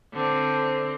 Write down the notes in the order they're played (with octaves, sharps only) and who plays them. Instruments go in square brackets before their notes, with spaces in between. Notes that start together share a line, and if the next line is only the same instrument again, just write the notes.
[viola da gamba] D3 C4